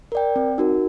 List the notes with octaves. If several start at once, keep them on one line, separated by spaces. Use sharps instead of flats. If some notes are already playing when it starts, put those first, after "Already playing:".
A#4 D5 G5
C4
D#4 F#4 A#4